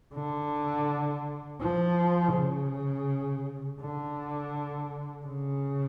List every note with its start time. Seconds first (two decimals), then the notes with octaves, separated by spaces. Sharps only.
0.14 D3
1.61 F3
2.34 C#3
3.81 D3
5.27 C#3